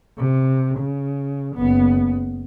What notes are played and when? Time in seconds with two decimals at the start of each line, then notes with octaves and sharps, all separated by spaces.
0.18 C3
0.78 C#3
1.55 F#1 B3